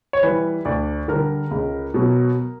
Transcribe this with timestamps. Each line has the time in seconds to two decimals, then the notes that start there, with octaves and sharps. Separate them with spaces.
0.13 C#5
0.23 E3 G3 B4
0.65 D2 D5
1.08 D3 G3 A#4
1.51 C#2
1.94 B2 F#3